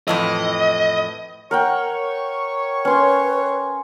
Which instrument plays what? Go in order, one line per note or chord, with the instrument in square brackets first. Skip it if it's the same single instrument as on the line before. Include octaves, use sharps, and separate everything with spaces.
[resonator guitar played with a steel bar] F2 A2 E3 [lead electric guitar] D#5
[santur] A#4 F#5 G5 [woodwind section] C#5 C#6
[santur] C#4 C6 [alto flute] B4